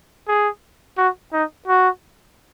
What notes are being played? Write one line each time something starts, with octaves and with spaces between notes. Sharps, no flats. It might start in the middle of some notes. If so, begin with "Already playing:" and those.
G#4
F#4
D#4
F#4